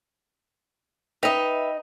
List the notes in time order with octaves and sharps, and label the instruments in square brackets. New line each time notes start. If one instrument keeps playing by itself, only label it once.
[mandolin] D#4 D#5 [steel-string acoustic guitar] B4 E5 [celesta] G5 B6 F7